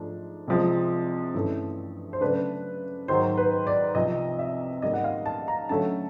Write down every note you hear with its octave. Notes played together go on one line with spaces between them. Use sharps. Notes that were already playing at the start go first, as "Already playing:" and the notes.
Already playing: G#2 F3 A3 D4
C2 C3 F3 G#3
G2 E3 A3 C#4
C5
C#3 F#3 A3 D4 B4
G#2 D#3 F#3 C5
B4
D5
C2 C3 F3 D#5
E5
G#2 D#3 G3 A#3 D#5
F#5
F5
A5
A#5
D3 F#3 A3 C#4 A5